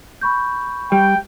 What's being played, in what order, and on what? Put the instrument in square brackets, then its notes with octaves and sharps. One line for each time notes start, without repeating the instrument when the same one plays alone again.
[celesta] B5 C#6 G6
[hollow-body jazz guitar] G3 [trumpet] G5